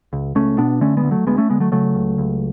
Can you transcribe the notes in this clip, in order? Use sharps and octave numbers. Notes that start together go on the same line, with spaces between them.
C#2
C#2 A3 C#4
B2 B3 D4
D3 A3 C#4
G#3 B3
D2
F#3 A3
D2 G#3 B3
A3 C#4
D3 G#3 B3
F#3 A3
C#3 F#3 A3
C#2
C#2